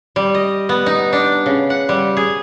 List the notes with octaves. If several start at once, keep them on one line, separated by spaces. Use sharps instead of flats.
G3
D#5
B3
D#4
D4
C#3
F#5
G3
G#4